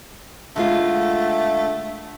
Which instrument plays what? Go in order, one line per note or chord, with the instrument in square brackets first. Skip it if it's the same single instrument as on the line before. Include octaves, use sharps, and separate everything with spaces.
[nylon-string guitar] D3 G#3 F4 [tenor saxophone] A3